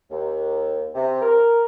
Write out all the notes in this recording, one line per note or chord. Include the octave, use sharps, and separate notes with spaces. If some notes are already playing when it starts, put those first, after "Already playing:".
D#2
C3
A#4